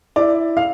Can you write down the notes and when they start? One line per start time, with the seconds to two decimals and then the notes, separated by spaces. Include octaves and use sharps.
0.16 E4 D5
0.57 F5